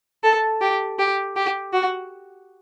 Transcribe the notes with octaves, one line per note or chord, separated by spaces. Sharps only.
A4
G4
G4
G4
F#4